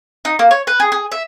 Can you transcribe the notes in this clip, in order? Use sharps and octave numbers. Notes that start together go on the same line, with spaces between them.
D#4
A#3
C#5
B4
G#4
G#4
E5